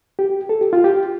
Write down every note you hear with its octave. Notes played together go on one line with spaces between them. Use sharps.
G4
A4
G4
F4
G4